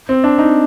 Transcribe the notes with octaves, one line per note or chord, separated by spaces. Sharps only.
C4
D4
D#4